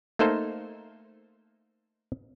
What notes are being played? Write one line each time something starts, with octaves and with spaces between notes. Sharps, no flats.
A3 A#3 D#4 A4 C5